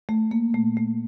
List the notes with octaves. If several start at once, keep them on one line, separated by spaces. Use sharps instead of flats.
A3
A#3
A#2 A3
A3